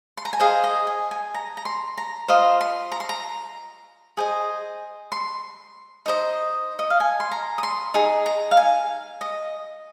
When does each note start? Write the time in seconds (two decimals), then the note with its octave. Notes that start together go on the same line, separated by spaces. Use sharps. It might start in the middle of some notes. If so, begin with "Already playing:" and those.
0.17 C6
0.25 A#5
0.33 G#5
0.40 G#4 C5 D#5 F5
0.64 D#5
0.87 G#5
1.11 G#5
1.34 A#5
1.57 A#5
1.65 C6
1.97 A#5
2.28 F4 C5 D#5 C6
2.61 C6
2.92 A#5
3.00 C6
3.09 A#5
4.17 G#4 C5 D#5
5.12 C6
6.06 D#4 C5 D#5
6.79 D#5
6.90 F5
7.00 G#5
7.20 C6
7.31 A#5
7.58 D#6
7.63 C6
7.94 D#4 G#4
8.26 A#5
8.51 F5
8.57 G#5
9.21 D#5